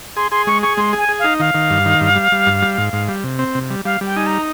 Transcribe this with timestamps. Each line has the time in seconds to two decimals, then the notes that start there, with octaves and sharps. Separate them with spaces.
0.17 G#4 C6
0.31 G#4 C6
0.47 G#3 C#6
0.63 G#4 C#6
0.77 G#3 C6
0.93 G#4 G#5
1.09 G#4
1.19 D#4 F5
1.40 D#3 F5
1.55 D#3
1.70 G2
1.86 D#3
2.01 G2
2.16 G3
2.32 G3
2.46 G2
2.62 G3
2.78 G#2
2.93 G#2
3.09 G3
3.24 C3
3.39 C4
3.55 C3
3.70 G3
3.85 G3 F5
4.01 G3 G5
4.16 D#4 G#5
4.27 A#5